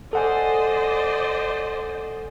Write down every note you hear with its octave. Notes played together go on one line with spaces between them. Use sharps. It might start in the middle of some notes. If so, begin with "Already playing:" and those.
A4 C5 D5 D#5 F#5 G#5